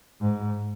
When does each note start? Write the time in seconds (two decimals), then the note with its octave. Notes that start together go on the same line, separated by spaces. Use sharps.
0.21 G#2